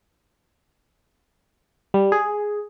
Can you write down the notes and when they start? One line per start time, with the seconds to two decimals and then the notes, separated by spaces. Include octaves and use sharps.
1.94 G3
2.12 G#4